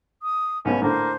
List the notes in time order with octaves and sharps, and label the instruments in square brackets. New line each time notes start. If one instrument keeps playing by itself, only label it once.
[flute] D#6
[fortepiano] B1 G#2 B2 [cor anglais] C#4
[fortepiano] A2 D3 [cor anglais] A#3 [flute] C5